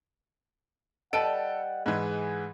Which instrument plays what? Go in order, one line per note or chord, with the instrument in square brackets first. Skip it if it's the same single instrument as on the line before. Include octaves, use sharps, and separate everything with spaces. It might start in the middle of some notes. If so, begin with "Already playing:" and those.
[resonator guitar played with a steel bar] G3 B4 A5 [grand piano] A4 D7 [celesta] D#5 [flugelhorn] F#5
[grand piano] G#2 E3 [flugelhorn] G#4